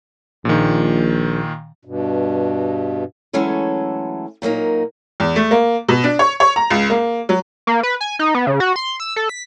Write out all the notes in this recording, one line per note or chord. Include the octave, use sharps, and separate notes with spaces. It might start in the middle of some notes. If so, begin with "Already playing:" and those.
A#1 A#2 D#3
G2 B2
E3 F#3 G#3 A3 C#4 A4
A#2 F#3 A#3 D#4
E2
A3
A#3
B2
D4
C#5
C#5
A#5
C#2
A#3
F#3
A#3
B4
G#5
D#4
B3
C#3
F#4
C6
E6
A4
B6